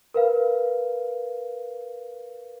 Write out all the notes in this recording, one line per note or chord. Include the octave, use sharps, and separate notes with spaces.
A#4 B4 F5